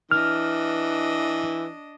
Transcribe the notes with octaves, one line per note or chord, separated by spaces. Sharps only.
E3 D4 D#5 F6